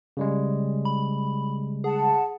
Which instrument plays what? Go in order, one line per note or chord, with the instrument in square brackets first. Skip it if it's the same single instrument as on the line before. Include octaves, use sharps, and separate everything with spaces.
[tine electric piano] C#3 G3 G#3
[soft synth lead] B5
[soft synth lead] G#4 [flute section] F#5 A5